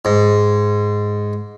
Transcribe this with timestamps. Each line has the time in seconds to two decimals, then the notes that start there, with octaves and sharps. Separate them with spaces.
0.05 G#2